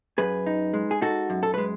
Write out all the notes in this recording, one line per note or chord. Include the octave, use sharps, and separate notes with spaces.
F#2 G#4 B4
D#4
G#3
G#4
D#4 F#4 A4
F#2
A4
G#3 B4